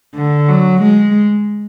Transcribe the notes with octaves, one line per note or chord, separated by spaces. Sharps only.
D3
F#3
G#3